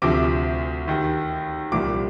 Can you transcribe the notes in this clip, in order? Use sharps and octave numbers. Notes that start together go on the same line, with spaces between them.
D2 C3 F3 D6
D#2 D#3
C2 A#2 F3 D6